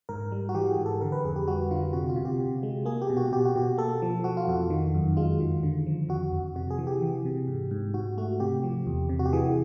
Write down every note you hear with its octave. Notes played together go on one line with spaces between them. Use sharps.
G#2 A#4
G3
F#4
E3 G4
G#4
G#2
A4
D3 A#4
B4
F2 G#4
G4
G3 F#4
D3 F4
C3 F#4
F4
C3
G4
C3
G#3
A#3 G#4
G4
B2
F#4
B2 G4
F#4
B2 G4
A#3 A4
F3
F3 F#4
F4
F2 F#4
D#3
F#2
G#3 F4
D#3
D3
F3
F2 F#4
F2
C3 F#4
G#4
E3
G4
E3
C3
G#2
G#2
G#2 F#4
A3 F#4
C3 G4
F3
E2
C3
F#4
G4
E3 G#4